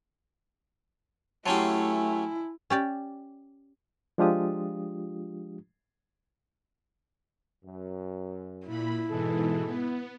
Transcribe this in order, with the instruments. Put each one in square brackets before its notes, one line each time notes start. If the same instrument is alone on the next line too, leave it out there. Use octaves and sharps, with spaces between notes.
[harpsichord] F#3 C#4 G4 [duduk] A3 [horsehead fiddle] E4 [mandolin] G#5 A5 C6
[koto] C#4 G4 D5
[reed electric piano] F3 G#3 D4 F4 G4 D#6
[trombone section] F#2
[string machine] A#2 B5 [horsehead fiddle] E4
[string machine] G#2 B2 E3 [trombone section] D#4 G#4 A4
[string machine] B3